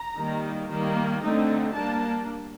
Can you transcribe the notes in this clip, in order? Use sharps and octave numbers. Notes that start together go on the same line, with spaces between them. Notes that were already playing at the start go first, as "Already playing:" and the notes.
Already playing: A#5
D#3 G3 A#3
D#3 G3 A#3
D3 A3 C4 D#4
G3 A#3 D4 A5